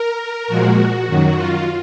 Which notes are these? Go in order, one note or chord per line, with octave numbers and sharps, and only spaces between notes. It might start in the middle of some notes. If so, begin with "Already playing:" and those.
Already playing: A#4
A#2 F3 G#3 F#4
F#2 D#3 F#3
F4